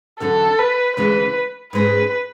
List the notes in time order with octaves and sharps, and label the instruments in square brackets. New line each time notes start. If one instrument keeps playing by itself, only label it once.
[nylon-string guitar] E2 D3 F#3 C#4 [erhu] A4
[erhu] B4
[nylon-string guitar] D2 C#3 E3 G#3 [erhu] B4
[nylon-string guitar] G#2 G#3 C#4 G#4 [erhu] B4